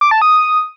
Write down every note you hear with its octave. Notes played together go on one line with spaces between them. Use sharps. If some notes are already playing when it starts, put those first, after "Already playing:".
D6
A5
D#6